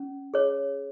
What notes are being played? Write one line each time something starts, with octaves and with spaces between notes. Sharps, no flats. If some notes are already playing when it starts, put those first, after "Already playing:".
Already playing: C#4
G#4 C#5